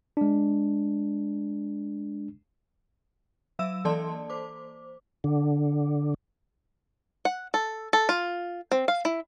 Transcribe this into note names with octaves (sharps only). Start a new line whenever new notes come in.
G#3 D4
F#3 E5 F5 E6 E7
E3 A#3 A4 D5 A5 C6
C5 D6
D3
F#5
A4
A4
F4
C4
F5
E4